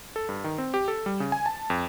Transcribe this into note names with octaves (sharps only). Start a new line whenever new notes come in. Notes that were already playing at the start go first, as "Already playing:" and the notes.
A4
G2
D#3
C4
G4
A4
G3
C#3
G#5
A5
F2